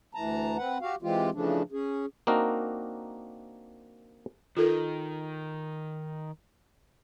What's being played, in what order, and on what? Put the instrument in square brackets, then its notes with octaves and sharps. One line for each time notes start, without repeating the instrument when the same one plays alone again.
[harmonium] D2 E3 A5 A#5
C4 B4 F#5
F#4 G4 F5
E3 G#3 C4 F4 G4
C#3 E3 F3 A3 D4
C#4 G#4
[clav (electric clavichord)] A#3 C4 D4 D#4 F#4 A#4
[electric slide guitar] D#3 [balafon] F4 A4 A#4